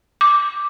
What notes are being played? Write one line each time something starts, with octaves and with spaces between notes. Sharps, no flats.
D6